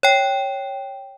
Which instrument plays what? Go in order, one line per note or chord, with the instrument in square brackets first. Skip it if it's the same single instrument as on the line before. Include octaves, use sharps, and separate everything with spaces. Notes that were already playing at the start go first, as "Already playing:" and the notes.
[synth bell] C#5 G5